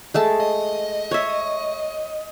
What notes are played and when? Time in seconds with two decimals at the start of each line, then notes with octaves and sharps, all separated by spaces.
0.14 G#3 A3 A5
0.40 D#5
1.11 C#5 E5